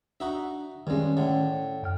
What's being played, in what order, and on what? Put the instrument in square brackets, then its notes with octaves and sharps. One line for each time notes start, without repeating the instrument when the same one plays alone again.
[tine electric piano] D4 [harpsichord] D#4 F#4 E5
[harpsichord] G2 G#3 [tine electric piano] D#3 C#4
[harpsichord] A2 D3
[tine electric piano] F#2 G5 F6